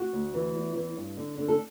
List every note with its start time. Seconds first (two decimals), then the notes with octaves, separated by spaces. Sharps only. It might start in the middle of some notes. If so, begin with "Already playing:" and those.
Already playing: F#4
0.13 D2
0.34 E3
0.55 E2
0.76 E3
0.97 G2
1.17 D3
1.38 D3
1.48 A4